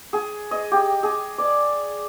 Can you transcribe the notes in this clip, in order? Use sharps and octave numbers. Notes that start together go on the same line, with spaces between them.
G#4
D#5
G4
G#4
D5